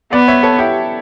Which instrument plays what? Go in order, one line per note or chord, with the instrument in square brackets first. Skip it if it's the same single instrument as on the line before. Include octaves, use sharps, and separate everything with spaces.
[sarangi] B3 [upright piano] D5 F#5
[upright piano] C#5 E5
A4 C#5
E4 G4